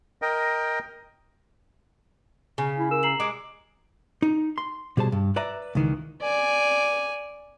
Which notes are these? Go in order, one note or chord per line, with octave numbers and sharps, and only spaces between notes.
A#4 D#5 G5
C#3
E4
A#4 E6
A#5 C7 F#7
G#3 D6
D#4
C6
B2 G3 G#4 C5 A5
G2
B4 D5 E5 A#5
C#2 D#3 E3
D5 G#5